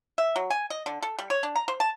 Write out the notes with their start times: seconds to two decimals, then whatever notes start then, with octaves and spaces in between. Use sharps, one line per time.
0.18 E5
0.36 F#3
0.50 G#5
0.70 D#5
0.86 D3
1.03 A4
1.19 G3
1.30 C#5
1.43 D4
1.56 A#5
1.68 C5
1.80 A5